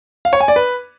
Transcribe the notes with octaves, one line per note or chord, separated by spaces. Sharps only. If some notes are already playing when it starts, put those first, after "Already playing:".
F5
C#5
G#5
D5
B4